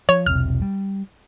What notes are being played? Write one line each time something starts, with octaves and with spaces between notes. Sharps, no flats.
F3 C#5
E1 B1 C3 F6
G3